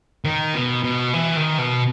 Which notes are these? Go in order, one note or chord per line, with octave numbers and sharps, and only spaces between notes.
D#3
B2
B2
E3
D#3
B2